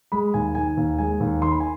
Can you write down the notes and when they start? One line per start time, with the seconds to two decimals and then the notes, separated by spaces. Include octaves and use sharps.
0.12 G#3 B5
0.34 D#2 G#5
0.55 D#3 G#5
0.77 D#2
0.98 G#3 G#5
1.20 D#2
1.42 D#3 C6
1.51 B5
1.60 G#5